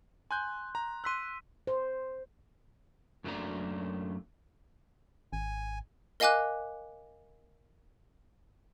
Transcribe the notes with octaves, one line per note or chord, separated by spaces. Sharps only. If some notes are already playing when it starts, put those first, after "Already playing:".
G#5 C6 F#6 G6
A#5
C6 E6 F#6 B6 D#7
C5
F#2 F#3 A3 A#3 D4 A#5
G#1 G#5
A#4 D#5 F5 G#5 D6 F#6